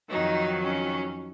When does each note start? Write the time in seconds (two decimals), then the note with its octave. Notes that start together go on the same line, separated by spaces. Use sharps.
0.09 F2 D#3 F#3 D#4
0.62 C#4